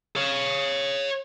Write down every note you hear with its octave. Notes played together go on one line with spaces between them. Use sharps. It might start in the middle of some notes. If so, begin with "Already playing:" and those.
C#5 F5